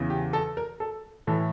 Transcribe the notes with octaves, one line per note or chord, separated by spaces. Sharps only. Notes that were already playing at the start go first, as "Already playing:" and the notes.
Already playing: E2 C#3 E3
G4
A4
A#4
A4
A2 E3 A4